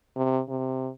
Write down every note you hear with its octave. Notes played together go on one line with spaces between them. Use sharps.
C3
C3